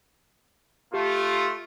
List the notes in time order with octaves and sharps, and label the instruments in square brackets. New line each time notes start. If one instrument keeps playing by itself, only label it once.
[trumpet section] A3 F4 [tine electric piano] G4